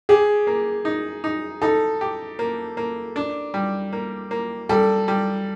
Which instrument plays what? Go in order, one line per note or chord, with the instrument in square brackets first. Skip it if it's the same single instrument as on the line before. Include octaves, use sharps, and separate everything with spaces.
[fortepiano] G4 [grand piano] G#4
[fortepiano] A#3
D#4
D#4
[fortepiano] D#4 [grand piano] A4
[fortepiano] G4
A#3
A#3
D4
G3
A#3
A#3
[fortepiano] G3 [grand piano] A4
[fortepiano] G3